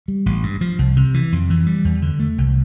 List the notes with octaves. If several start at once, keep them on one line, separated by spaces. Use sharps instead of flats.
G3
A1
G2
F3
C2
C3
E3
F2
E3
G3
E2
D3
A3
C2